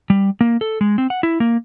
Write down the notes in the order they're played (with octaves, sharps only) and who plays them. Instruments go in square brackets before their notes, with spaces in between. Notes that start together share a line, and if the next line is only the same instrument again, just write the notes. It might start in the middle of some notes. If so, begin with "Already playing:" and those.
[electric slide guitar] G3
A#3
A4
G#3
C4
F#5
E4
A#3